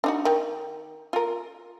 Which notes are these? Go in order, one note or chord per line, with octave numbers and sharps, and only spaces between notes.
D4 D#4 F#4
D#3
F4 A#4